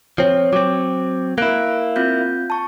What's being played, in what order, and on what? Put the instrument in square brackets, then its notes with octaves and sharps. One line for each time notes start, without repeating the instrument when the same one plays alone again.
[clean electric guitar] F3 C4 [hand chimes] C#5
[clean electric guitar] F#3 C4 [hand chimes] D6
[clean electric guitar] A#3 E4 [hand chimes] F#6 D7
[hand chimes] C4 F4 G6
A5 C#6